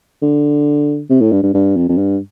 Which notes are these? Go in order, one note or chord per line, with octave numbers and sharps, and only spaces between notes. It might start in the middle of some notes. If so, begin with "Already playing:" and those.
D3
C3
A2
G2
G2
G2
F2
F2
G2